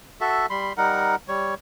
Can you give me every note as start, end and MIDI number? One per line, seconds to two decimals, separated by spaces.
0.21 0.46 66
0.21 0.46 69
0.21 0.46 76
0.50 0.73 55
0.50 0.73 83
0.50 0.73 84
0.77 1.15 55
0.77 1.15 63
0.77 1.15 70
0.77 1.15 78
1.28 1.54 55
1.28 1.54 73